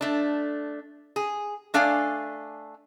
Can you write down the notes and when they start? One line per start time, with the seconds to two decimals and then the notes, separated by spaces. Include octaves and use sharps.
0.01 A3 D4
1.16 G#4
1.74 A3 D4 D5 F5 G#5